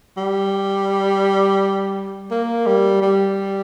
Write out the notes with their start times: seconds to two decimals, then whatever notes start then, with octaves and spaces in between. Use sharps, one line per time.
0.17 G3
2.31 A#3
2.66 G3
3.02 G3